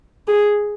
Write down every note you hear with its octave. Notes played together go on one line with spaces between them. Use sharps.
G#4